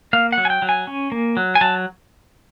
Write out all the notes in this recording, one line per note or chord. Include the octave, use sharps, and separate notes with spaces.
A#3 F5
F#5
F#3
G#5
G5
F#3
G#5
C#4
A#3
F#3
G#5
F#3 A5